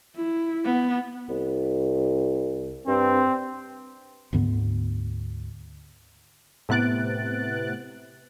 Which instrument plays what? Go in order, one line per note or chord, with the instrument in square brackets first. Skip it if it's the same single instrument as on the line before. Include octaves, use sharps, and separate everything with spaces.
[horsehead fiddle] E4
B3
[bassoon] C2
[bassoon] G2 [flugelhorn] C4
[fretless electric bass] D2 G#2 D3 B3
[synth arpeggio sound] A2 C3 B3 F#6 A6 D7